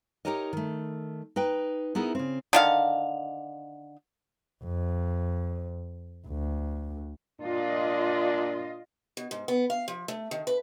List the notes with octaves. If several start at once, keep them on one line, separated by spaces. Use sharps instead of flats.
D#4 F4 G4 A#4 C#5 D#5
D#3 A3
D#4 B4 G5
B3 D#4 E4 G#4 A#4
C#3 C4
D3 D#3 F5
F2
D2
A#2 D4 F4 D#5
B2
G#2
B3
F5
F3
A3
D#3
B4